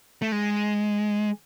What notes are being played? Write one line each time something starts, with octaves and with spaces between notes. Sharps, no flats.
A3
G#3